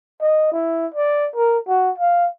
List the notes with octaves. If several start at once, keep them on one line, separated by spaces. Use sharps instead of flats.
D#5
E4
D5
A#4
F#4
F5